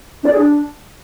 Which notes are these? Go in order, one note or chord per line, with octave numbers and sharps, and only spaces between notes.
D4
D5
G#4
D4